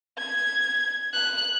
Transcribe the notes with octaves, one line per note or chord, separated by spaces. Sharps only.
G#6
F#6